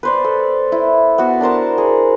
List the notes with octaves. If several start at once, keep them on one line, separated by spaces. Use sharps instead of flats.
B4 C5 D5
A4
E4
B3 F#4 A4
D4 A#4 C5 A5
G#4